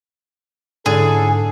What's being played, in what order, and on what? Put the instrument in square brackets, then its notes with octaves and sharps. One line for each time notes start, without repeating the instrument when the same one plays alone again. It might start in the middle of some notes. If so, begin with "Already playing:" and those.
[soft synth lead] G#2 [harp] D3 [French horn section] C#4 E4 A4 [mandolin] G#4